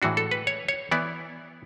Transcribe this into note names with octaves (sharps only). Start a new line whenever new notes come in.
A2 E3 G#3 D4 F#4
A4
B4
C#5
C#5
E3 B3 E4 D5